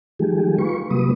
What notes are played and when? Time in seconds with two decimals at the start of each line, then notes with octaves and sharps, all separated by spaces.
0.19 D#3 F3 G3 A3 G4 G#4
0.59 F4 B4 C#6
0.90 C3 F#3 G3 A#3 B4 D#6